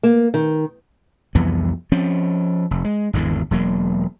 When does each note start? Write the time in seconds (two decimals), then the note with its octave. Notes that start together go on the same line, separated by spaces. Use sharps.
0.03 A#3
0.34 D#3
1.35 C2 F2 E3 B3
1.92 F3 C4 C#4
2.71 F1
2.85 G#3
3.13 G#1 E2 D3 E3
3.51 E1 F#3 A#3